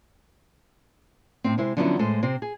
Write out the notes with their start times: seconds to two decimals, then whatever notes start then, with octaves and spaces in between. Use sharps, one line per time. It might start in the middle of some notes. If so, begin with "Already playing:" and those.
1.44 A2 C4
1.58 C3 G#3 E4 C5
1.77 D3 F3 F#3 B3 C#4 E4
1.99 A2 G#3 A4 C5
2.23 C3 C4 C5
2.42 G#4